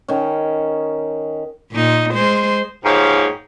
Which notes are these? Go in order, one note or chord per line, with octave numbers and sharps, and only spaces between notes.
D#3 C#4
A#2 D#4
G#3 C5
G#2 B2 F3 A#3 G4 C#5